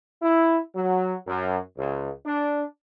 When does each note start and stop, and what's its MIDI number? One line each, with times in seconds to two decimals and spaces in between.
0.23 0.58 64
0.75 1.14 54
1.27 1.59 42
1.77 2.10 37
2.26 2.62 62